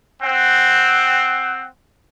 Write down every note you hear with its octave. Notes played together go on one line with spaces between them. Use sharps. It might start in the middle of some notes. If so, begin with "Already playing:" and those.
C4 F#5